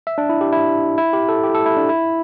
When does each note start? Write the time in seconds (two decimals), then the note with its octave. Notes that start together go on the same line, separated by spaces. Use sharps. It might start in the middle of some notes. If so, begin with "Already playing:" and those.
0.07 E5
0.18 D4
0.29 E4
0.41 G4
0.52 E4
0.98 E4
1.13 G4
1.29 A4
1.43 G4
1.55 A4
1.66 E4
1.77 D4
1.89 E4